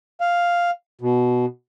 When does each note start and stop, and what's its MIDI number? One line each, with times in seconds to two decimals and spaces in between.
0.21 0.70 77
1.01 1.46 47